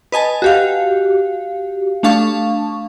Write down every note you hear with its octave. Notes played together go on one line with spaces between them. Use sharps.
B4 D#5 G#5 A5
F#4 G4 F5
A3 D4 F5 A5 C#6